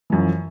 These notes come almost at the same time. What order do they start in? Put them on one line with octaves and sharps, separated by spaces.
E3 F#2 F3